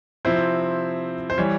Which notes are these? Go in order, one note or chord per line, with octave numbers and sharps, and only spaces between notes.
C3 F3 C4 E4 C5
C5
E3 G3 C#5